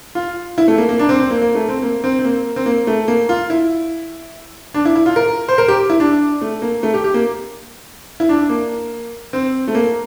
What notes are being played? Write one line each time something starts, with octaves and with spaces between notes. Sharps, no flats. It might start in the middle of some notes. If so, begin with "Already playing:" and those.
F4
E4
A3
A#3
A#3
D4
C4
C4
A#3
A#3
A3
C4
A#3
C4
C4
A#3
C4
A#3
A3
A#3
F4
E4
D4
E4
E4
F4
A#4
C5
A#4
G4
E4
D4
A3
A#3
A3
G4
G4
A#3
E4
D4
A#3
C4
A3
A#3